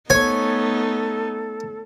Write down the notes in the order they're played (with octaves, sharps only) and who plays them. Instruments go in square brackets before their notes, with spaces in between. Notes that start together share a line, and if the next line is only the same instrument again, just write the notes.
[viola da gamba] A3 B3 D#4 [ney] A4 [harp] C#5 [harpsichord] G#5